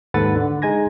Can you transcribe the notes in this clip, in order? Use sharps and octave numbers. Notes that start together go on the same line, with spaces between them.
D#2 G#2 A4 B4 F#5 A6
D3
G#3 D#4 G#5 G#6 A#6